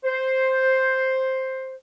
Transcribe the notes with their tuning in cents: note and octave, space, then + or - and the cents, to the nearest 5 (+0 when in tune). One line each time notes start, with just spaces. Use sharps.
C5 +5